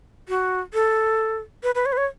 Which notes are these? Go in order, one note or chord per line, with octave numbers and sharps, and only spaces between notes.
F#4
A4
B4
B4
C#5
B4
C#5